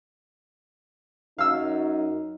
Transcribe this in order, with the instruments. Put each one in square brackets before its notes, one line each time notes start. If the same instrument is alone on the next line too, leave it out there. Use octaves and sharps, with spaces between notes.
[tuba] F#2 [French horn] D#4 [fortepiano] F5 E6